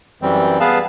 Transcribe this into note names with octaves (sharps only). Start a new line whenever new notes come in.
F#2 E3 G3 C4
B3 G#4 B4 F5 A5